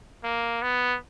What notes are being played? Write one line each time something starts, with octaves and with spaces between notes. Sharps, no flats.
A#3
B3